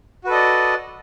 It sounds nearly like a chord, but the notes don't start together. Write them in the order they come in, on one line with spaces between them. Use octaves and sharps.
F#4 B4 A4 D#5 D5